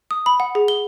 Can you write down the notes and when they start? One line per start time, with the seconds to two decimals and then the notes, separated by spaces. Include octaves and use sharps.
0.11 D#6
0.26 B5
0.40 F#5
0.55 G#4
0.68 G7